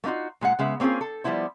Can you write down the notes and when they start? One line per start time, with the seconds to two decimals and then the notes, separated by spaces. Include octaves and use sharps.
0.04 A3 A#3 D#4 F4 F#4
0.41 A#2 G#3 E4 F#5
0.59 C#3 G#3 B3 E5
0.80 A#3 C4 C#4 F4 G#4
1.01 A4
1.24 F3 G3 B3 E4 C5